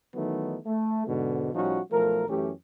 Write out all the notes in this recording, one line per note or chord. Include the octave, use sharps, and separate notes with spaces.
D#3 E3 F#3 A3 B3 D#4
A3
G#2 B2 D3
A2 F3 G3 C#4 D#4 F#4
B1 F3 A3 A#4
F#2 E3 A3 C#4 G4